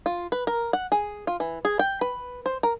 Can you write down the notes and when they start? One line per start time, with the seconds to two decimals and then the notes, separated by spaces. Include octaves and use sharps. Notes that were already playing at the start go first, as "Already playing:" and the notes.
0.06 F4
0.32 B4
0.47 A#4
0.73 F#5
0.92 G#4
1.27 F4
1.40 E3
1.65 G#4
1.79 G5
2.01 B4
2.46 C5
2.63 A#4